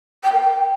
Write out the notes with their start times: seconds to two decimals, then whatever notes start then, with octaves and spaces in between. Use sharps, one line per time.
0.23 G5
0.31 A#4
0.40 G5